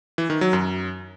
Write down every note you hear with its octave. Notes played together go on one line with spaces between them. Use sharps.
E3
D#3
F#3
F#2